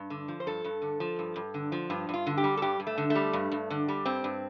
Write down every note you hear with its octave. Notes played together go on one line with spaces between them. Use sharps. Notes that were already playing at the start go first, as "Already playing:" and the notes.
Already playing: G2
D3
F3
C5
G2 A4
G2
D3
F3
G2
G2
D3
F3
G2 F4
G2 F4
D3
G4
G3
A4
G2 G4
G2
A3
D3
A3
G3
G2
G2
D3
G3
G2 C4
G2